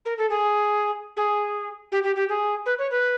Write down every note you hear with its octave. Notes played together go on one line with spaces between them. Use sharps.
A#4
A4
G#4
G#4
G4
G4
G4
G#4
B4
C#5
B4